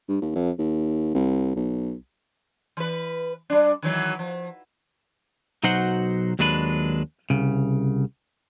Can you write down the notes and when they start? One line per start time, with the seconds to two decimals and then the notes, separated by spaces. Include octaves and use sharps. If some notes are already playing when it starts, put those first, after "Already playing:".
0.08 G2
0.21 D#2
0.35 F2
0.58 D#2
1.14 C2
1.56 B1
2.77 E3 B4
3.50 G3 D4
3.82 D#3 E3 F#3
4.19 F3
5.63 B1 F#3 D#4 F#4 C5 F#5
6.39 D#2 F#3 G#3 D4 F4 B4
7.30 C2 C#3